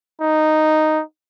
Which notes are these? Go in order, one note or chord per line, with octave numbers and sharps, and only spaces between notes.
D#4